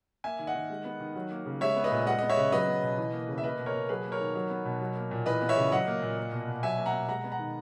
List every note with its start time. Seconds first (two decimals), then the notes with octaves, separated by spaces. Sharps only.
0.24 A#3 E5 G#5
0.39 D#3
0.47 D#5 F#5
0.55 D#3
0.70 G#3
0.85 B3
1.00 D#3
1.15 F#3
1.31 A#3
1.46 C#3
1.61 G#3 C#5 E5
1.76 B3
1.84 B4 D#5
1.92 A#2
2.06 G#3 D#5 F#5
2.19 B3 D#5
2.30 C#5 E5
2.37 C#3
2.52 F#3 B4 D#5
2.67 B3
2.83 B2
2.98 E3
3.13 A#3
3.28 C#3
3.38 E5
3.44 A#3 B4 D#5
3.59 B2
3.66 A#4 C#5
3.74 B2
3.89 F#3 G#4 B4
4.04 A#3
4.12 A#4 C#5
4.20 D#3
4.35 F#3
4.50 B3
4.65 B2
4.81 F#3
4.96 A#3
5.11 A#2
5.26 E3 B4 D#5
5.42 B3
5.49 C#5 E5
5.57 C#3
5.72 F#3 D#5 F#5
5.87 A#3
6.02 A#2
6.17 A#3
6.33 B2
6.48 B2
6.63 F#3 E5 G#5
6.78 A#3
6.86 F#5 A#5
6.93 B2
7.08 G#3 F#5 A#5
7.24 B3
7.32 F#5 A#5
7.39 D#3